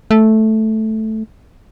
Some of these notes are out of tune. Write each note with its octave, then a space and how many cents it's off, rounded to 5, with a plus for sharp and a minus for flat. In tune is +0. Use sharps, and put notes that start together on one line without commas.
A3 -5